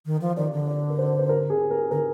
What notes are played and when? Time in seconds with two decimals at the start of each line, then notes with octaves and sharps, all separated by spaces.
0.06 D#3
0.21 F3
0.37 D#3 D5
0.52 D3
0.67 D5
0.90 A#4
0.98 C5
1.19 C5
1.29 A#4
1.50 G#4
1.71 A#4
1.91 D3 A#4